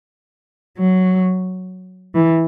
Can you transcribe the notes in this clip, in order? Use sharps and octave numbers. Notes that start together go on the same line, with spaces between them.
F#3
E3